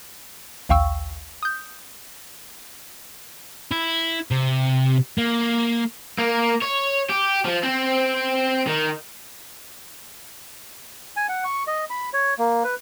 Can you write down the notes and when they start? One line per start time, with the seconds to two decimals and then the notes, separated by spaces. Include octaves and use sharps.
0.69 A#1 D#2 F5 G5 C#6 E6
1.43 D#6 G6
3.72 E4
4.31 C3
5.18 A#3
6.18 A#3
6.62 C#5
7.09 G4
7.45 F3
7.64 C4
8.67 D#3
11.16 G#5
11.29 F#5
11.45 C#6
11.67 D#5
11.90 B5
12.13 C#5
12.38 A#3
12.64 B4